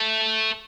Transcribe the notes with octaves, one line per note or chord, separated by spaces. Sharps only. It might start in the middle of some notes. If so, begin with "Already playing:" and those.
Already playing: A3